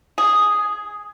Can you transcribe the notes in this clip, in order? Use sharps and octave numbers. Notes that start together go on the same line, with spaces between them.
G#4